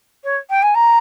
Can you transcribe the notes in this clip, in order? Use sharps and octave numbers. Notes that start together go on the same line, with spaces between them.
C#5
G5
G#5
A#5